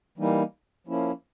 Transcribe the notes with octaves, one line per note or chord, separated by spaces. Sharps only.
E3 G3 A#3 D#4
F3 A#3 C#4 E4